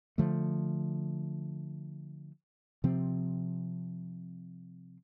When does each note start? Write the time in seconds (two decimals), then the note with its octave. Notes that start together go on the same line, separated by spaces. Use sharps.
0.18 D3 F3 A3
2.84 C3 F3 C4